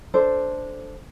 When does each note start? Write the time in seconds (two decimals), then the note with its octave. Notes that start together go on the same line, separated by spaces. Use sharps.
0.14 D4 A4 C5